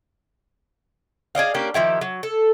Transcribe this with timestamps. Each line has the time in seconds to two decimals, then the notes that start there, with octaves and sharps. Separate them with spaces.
1.35 G#4 D5 D#5 F5
1.54 A#3 C#4 D4 G4
1.74 D#3 F3 E4 G4
2.01 F#3
2.23 A4